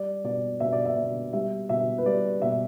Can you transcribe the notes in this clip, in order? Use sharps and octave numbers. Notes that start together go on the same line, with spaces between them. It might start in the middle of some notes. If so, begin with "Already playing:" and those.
Already playing: G3 D5
B2 D5
B2 E5
D5
E5
B2
G3 E5
B2 E5
B4
G3 D5
B2 E5